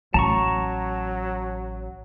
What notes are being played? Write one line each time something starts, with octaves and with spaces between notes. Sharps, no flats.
A1 F#3 A5 A#5 C#6